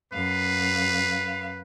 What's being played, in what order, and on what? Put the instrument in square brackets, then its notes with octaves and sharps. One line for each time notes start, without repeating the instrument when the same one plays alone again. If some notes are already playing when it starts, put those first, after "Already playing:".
[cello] F#2 F5 [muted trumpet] B4